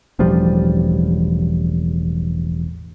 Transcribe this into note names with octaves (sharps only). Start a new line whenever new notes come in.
E1 A1 F3 G3